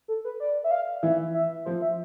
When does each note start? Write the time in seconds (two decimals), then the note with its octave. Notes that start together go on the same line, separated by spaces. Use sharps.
0.08 A4
0.25 B4
0.40 D5
0.64 E5
0.71 F5
1.03 E3 E5
1.34 E5
1.65 F3 C5
1.82 E5